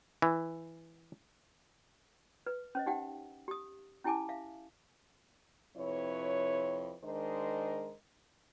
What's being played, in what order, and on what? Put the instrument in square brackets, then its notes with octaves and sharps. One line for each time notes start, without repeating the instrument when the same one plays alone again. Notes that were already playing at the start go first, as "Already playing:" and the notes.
[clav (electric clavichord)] E3
[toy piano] B4
C#4 C5 D#5
D#4 G4 F#5 G5
G4 D#6
C#4 E4 G4 G#5 A5 D6
E5 F5
[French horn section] F2 C3 E4 B4 C#5
D#3 G#3 D4 A#4 C5 D#5